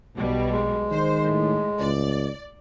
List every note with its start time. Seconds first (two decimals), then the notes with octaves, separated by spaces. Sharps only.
0.16 B1 B2 G3
0.50 G#3
0.91 D#3 C5
1.22 A2
1.80 C#2 D5